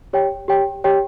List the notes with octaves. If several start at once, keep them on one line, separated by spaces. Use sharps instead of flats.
G4 C#5 G5
G4 C#5 G5
G4 C#5 G5